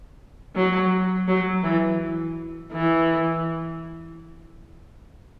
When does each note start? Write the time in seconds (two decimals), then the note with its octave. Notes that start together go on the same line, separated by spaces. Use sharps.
0.55 F#3
1.28 F#3
1.63 E3
2.72 E3